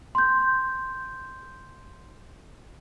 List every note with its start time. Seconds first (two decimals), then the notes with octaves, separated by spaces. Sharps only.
0.15 C6 G6